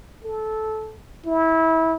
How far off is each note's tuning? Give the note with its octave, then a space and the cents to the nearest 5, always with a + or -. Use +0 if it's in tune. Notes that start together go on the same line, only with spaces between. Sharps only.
A4 -15
E4 -25